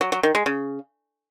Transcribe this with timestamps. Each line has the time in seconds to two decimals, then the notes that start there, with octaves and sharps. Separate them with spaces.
0.01 F#3
0.12 F#3
0.23 D#3
0.35 G#3
0.46 C#3